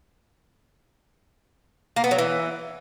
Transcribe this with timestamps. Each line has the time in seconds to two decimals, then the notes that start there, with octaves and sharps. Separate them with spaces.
1.96 A#3
2.04 B3
2.11 F#3
2.18 E3